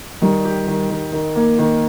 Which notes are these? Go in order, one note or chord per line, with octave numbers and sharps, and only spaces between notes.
D#3 G3
G4
D#3
D#3
D#3
A#3
D#3